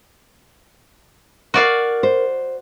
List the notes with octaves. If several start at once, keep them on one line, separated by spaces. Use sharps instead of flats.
F#4 A#4 D5 F5
C5